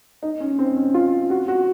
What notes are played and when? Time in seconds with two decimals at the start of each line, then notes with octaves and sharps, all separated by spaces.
0.23 D#4
0.40 C#4
0.59 C4
0.76 C#4
0.94 F4
1.30 F#4
1.48 F#4